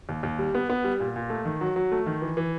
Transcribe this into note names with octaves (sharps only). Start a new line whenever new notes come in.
D#2
D#2
G3
B3
B3
G3
A#2
A#2
A3
D#3
F#3
F#3
A3
D#3
E3
E3